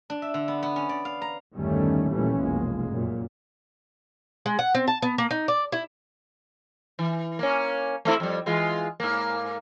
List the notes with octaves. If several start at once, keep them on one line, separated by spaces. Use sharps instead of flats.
D4
E5
D3
B3
B3
C#4
D5
F5
A#5
G1 E2 D#3 G3 A3 C#4
A#1 D#2 E3 G3 A3 C#4
F1 B1 G#3 A#3
F#2 A#2
G#3
F#5
C4
A5
B3
A#3
D#4
D5
E4
E3
A#3 C#4
A3 C4 E4
F2 G3
E3 G#3 F4
G#2 A#3